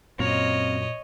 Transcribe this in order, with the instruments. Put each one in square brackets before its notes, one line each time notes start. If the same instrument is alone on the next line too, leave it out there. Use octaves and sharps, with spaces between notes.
[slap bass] F#2 [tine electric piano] A#2 [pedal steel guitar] C4 F5 A#5 [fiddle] C#5 D#5